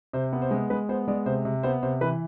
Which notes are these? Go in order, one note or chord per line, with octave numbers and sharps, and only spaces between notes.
C3 C5
B3
C5
G#3
G#3 B4
B3 C5
G#3 D5
C3 C5
C3
B3 C5
C3 C5
E3 B4